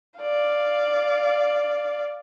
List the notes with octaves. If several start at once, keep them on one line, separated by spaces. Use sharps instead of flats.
D5 F5